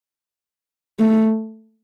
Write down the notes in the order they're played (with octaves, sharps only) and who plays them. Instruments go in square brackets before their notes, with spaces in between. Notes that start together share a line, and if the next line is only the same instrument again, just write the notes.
[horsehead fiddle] A3